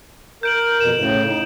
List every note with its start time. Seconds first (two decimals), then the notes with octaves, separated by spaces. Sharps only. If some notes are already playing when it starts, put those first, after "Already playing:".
0.43 A#4 G6 D7 F#7
0.80 F2 B2 E7
0.96 A2 C#3
1.27 D#4